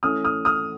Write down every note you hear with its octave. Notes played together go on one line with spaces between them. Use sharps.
E3 A3 C#4 D#6 F6
D#6 F6
D#6 F6